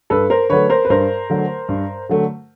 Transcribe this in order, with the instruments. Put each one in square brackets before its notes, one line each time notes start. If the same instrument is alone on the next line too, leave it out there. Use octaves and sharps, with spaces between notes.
[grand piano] G2 [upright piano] A4 B4
[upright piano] A#4 C5
[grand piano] D3 F#3 A3 [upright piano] B4 C#5
[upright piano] A#4 C5
B4
[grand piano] G2 [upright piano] A#4 C5
[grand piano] D3 F#3 A3
G2
D3 F#3 A3